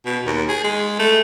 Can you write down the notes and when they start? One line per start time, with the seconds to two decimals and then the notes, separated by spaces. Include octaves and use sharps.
0.05 B2
0.26 D#2
0.49 G#4
0.64 G#3
0.99 A3